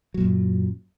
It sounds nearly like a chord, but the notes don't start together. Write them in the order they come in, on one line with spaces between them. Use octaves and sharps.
F#3 A#2 F#2